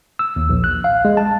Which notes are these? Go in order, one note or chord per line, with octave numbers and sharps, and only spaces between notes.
E6
D#2
A#1
F#6
F5
G#3
A5